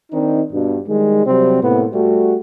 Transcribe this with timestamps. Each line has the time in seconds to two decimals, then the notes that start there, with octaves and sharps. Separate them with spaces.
0.12 D#3 C4 D4 D#4
0.53 G2 B2
0.87 D#3 G3 G#3
1.26 C3 F#3 G3 C4
1.62 A2 C3 A#3 B3
1.94 G3 A3 F#4